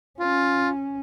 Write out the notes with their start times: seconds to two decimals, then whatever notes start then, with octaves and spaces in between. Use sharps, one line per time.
0.19 C#4 F4